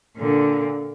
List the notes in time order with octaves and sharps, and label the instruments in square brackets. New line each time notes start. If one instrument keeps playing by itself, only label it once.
[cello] A#2 D3